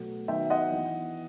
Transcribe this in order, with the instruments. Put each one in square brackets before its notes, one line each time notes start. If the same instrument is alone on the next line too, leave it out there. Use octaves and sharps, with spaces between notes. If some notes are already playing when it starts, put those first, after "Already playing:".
Already playing: [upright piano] B2 F#3 A3
D#3 F#3 B3 E5 G5
D#5 F#5
E3 B3